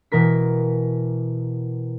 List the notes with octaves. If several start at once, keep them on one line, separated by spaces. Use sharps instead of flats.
B2 E3 A#4 B6